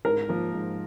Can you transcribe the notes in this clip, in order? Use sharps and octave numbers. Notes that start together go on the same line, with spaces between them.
G#2 A#4
F3 A#3
G#2